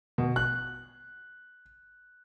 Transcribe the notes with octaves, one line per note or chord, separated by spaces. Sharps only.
B2
F#6